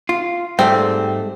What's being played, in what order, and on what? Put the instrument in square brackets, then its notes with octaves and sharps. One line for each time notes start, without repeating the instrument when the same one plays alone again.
[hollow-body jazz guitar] F4
[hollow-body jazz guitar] G#2 G3 A3 [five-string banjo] C4